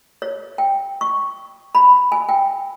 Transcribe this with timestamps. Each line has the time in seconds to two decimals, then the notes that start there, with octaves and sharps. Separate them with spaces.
0.22 C#5
0.58 G5
1.01 C#6
1.75 B5
2.12 G#5
2.29 G5